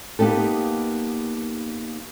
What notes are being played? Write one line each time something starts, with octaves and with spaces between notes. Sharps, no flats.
A#3 B3 D#4 G4 A4